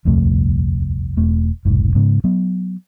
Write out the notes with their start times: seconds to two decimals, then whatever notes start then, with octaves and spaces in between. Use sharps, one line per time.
0.05 D#1 C2 F2 A3
1.17 E1 A3
1.65 F1 B1 G#2
1.95 G#2 C#3
2.24 F#3 B3